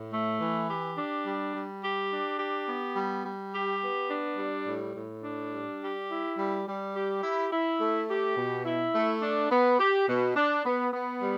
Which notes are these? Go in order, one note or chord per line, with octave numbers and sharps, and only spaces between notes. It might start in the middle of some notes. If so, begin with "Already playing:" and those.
Already playing: A2
A3
E3
G4
D4
G3
G3
G4
D4
G4
B3
G3
G3
G4
B3
D4
G3
A2
A2
D4
G3
G4
E4
G3
G3
G4
E4
E4
A3
G4
B2
E4
A3
D4
B3
G4
B2
D4
B3
B3
G3